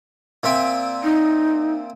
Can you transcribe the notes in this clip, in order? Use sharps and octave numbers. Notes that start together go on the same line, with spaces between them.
A#2 C4 E5
D#4